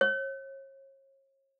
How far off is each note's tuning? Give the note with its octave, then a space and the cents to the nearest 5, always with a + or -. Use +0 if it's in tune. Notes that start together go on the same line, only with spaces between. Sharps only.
C#5 -35